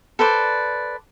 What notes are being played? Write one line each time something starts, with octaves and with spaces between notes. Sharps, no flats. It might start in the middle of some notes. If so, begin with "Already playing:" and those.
A4 B4 C5 D5